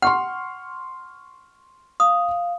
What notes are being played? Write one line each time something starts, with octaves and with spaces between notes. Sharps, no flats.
F#5 C6 C#6 F6
F5 D#6